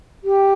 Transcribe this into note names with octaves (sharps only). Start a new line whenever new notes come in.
G4